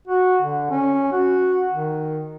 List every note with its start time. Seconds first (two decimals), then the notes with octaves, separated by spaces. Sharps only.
0.08 F#4
0.42 D3
0.71 C#4
1.12 F#4
1.72 D#3